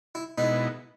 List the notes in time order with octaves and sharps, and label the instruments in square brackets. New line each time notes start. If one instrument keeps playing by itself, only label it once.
[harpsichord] E4
[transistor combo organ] B2 G#3 B3 E4 [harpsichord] D#4